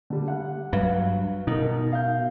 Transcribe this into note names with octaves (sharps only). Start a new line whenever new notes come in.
D3 G3
F#5
G2 F#3 B4 F5
B2 D#4 A#4
F5 G6